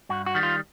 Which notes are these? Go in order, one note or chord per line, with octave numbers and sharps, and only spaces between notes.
G2 F#4
F#4
D#3 G3
F4